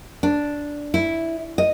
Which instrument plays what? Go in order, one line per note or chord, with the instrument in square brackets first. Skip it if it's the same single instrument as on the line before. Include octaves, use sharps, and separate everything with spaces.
[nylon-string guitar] D4
E4
D#5